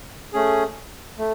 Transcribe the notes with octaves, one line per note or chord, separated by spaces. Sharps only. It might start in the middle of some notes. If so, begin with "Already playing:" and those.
A3 C#4 G#4
A3